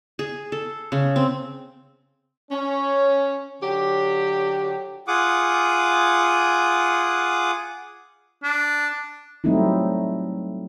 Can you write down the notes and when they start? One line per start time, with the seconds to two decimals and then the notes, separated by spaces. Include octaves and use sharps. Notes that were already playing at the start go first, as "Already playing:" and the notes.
0.19 G#4
0.52 A4
0.92 C#3
1.16 C4
2.51 C#4
3.62 D3 F#3 G4
5.08 F4 G#4 F#5 D6 D#6
8.43 D4
9.44 F#3 G3 A3 C4 D#4 E4